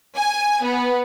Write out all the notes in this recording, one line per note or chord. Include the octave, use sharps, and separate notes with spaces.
G#5
B3